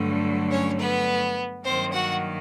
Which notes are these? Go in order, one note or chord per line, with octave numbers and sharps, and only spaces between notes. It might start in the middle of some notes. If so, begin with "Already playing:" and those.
Already playing: G2 D3 F#3 A3
C#4 C#5
B3 B4
G2 D#3 F#3 A#3 C4 C5
F#4 F#5